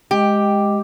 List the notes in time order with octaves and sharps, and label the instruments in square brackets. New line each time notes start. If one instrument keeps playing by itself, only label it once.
[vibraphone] G#3 D#5 G5 [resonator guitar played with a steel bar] G4